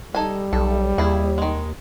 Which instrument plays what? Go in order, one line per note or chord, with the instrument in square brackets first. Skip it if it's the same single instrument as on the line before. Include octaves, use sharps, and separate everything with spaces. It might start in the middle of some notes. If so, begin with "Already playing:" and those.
[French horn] G3 [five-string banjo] D#4 A4 G#5
[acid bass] B1 [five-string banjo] A4
[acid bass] D#2 [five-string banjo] E4 G#4
[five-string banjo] D#3 G#3